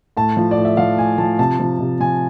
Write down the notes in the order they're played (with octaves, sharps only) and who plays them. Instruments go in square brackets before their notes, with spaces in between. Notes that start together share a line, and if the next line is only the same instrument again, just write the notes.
[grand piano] A2 A5
F3
D5
A2
E5
F3 F5
A2 G#5
F3 A5
C3 A5
F3
C3
F3 G#5